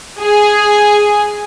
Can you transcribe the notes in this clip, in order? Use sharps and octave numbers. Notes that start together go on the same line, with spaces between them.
G#4